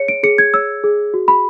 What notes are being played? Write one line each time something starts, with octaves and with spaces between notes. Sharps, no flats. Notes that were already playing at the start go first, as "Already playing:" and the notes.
Already playing: G#4 C#5 C#7
D7
G#4 C#7
G#6
C#5 E6
G#4
F#4
B5